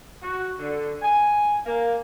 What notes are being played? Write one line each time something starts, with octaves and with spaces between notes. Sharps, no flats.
F#4
D3
G#5
A#3